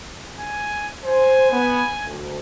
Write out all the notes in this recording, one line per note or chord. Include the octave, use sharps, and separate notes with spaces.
G#5
C5 G#5
B3
D2